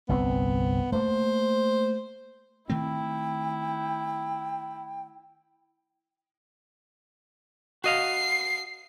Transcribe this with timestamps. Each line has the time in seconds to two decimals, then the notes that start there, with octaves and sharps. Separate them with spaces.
0.09 G1 C2 B3 C4
0.92 A3 A#3 C5
2.70 D#3 A3 C4 E4 G5
7.84 F#4 D#5 F5 C7